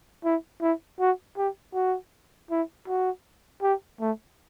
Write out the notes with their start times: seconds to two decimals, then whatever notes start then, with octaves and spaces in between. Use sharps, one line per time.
0.25 E4
0.61 E4
1.00 F#4
1.37 G4
1.74 F#4
2.51 E4
2.87 F#4
3.62 G4
4.00 A3